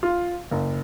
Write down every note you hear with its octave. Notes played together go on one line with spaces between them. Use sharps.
F4
F#1